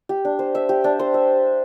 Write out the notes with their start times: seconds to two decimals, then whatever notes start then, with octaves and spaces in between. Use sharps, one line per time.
0.09 G4
0.25 D4
0.39 C5
0.55 E5
0.69 G4
0.84 D4
0.99 C5
1.14 E5